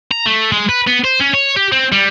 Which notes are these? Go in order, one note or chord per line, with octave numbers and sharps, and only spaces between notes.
A#5
A3
G#3
B4
B3
C5
C#4
C#5
G4
C4
G3